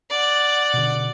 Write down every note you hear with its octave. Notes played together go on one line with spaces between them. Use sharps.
D5 F#5
B2 D3